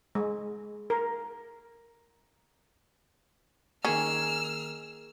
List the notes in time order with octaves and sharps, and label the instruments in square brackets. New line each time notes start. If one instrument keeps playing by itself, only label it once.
[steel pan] G#3
A#4
[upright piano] D#3 A#3 [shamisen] C#4 [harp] G#4 [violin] E6 F6